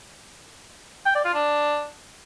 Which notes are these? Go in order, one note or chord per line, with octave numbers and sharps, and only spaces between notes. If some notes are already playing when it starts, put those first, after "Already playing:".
G5
D5
F4
D4